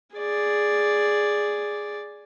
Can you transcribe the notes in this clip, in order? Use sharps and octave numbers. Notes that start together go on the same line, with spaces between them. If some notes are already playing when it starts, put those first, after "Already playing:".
G#4 D5